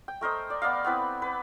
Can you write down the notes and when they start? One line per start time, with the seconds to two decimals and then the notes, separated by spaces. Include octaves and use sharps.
0.08 G5
0.21 A3 A#4 C5 D#5
0.50 D5
0.62 B3 D5 D#5 F5
0.84 B3 C4 E4 B4
1.22 B4